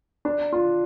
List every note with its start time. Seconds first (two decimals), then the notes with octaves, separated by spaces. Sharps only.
0.25 D4
0.53 F4